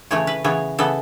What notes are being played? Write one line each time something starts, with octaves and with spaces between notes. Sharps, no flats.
C#3 E3 A3 C#5
B4
C#3 E3 B3 C#5
C#3 E3 B3 A4